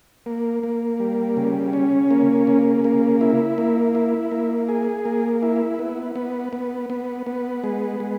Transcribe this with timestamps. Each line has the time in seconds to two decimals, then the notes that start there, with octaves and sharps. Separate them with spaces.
0.26 A#3
0.63 A#3
1.00 G3
1.37 C#3
1.73 C#4
2.11 A#3
2.47 C#3
2.84 A#3
3.21 E4
3.58 A#3
3.95 E4
4.32 A#3
4.69 G#4
5.05 A#3
5.43 E4
5.79 B3
6.15 B3
6.53 B3
6.90 B3
7.26 B3
7.64 G#3
8.00 G#3